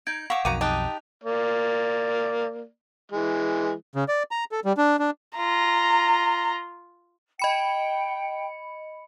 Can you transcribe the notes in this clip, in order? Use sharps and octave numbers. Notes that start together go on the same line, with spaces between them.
D#4 G6 G#6 D7
F5 F#5 C#6 D6
B1 F2 D#3 F#4 A#5 D6 D#7
D#4 G4 A5 D6 D#6 F#6
A#3 D5
E3 G#3
C#3
D5
A#5
A4
G3
D4
D4
F4 A#5
D#5 G5 B5 C#7